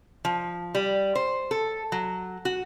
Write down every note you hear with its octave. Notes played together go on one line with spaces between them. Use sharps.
F3
G3
C5
A4
F#3
F#4